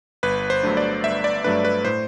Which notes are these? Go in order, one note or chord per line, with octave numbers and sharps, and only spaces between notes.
G1 B4
C5
G2 F#3 A3 D4
D5
G1 E5
D5
G2 F#3 A3 D4 B4
B4
A2 C5